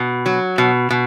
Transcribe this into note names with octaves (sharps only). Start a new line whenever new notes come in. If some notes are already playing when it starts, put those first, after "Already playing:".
Already playing: B2
F#3
B2
B2